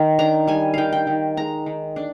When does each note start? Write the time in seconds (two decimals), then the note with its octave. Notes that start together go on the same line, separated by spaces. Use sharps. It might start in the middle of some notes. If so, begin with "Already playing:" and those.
Already playing: D#3
0.19 D4 A#5
0.47 G3 G#5
0.74 D#3 F5 G5
0.92 G5
1.07 D#3
1.37 G#3 A#5
1.66 D#3
1.96 D4